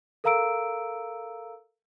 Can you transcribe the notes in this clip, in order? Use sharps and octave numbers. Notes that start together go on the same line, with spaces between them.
A4 A#4 F5 A#5 E6 D7